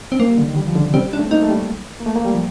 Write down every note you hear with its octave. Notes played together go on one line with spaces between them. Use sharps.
C4
A3 A#3
G3
D3
D#3
G3
F3
D3
C3
G3 C4
G3
D4
A3
C4
A#3 D#4
A3
G3
A#3
A3
A#3
G3
F3